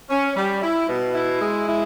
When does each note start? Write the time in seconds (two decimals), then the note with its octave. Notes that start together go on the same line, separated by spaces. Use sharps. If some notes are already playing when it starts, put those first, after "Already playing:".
0.10 C#4
0.36 G3
0.62 E4
0.89 B2
1.15 E4
1.41 G#3
1.68 E4